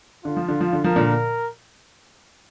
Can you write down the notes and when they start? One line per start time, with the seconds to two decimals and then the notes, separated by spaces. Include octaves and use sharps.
0.25 D3 F4
0.36 F3
0.48 D3
0.60 F3
0.73 D3
0.84 F3 A#4
0.96 A#2 D3